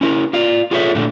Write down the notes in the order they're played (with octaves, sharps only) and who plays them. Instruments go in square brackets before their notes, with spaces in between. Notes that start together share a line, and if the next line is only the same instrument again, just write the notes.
[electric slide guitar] C#4 E4 A#4
F4 D5 F5
F4 G#4 A4 C#5 E5
A#2 D3 A3 D4